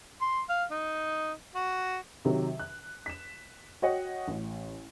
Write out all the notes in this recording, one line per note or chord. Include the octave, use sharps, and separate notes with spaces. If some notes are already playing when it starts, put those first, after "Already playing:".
C6
F5
D#4
F#4
C3 D#3 F#3
F#6
B6 E7
F#4 C#5 D#5 F#5 G5
A1